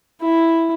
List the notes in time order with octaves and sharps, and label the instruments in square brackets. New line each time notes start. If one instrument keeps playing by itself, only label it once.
[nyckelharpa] E4